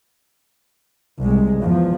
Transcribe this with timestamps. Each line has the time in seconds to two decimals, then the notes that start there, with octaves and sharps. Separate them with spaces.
1.25 C2 G#3
1.62 E2 F3